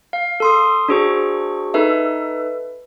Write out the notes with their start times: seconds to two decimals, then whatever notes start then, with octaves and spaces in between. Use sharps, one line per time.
0.13 F5
0.40 A4 C6 D#6
0.88 D4 F#4 G#4 C5 C#6
1.74 D#4 A4 B4 E5